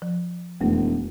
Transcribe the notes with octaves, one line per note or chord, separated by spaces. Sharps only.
F3
E1 F2 A3